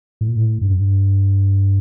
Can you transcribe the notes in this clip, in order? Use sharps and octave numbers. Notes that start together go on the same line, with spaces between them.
A2
A#2
A2
G2
F#2
G2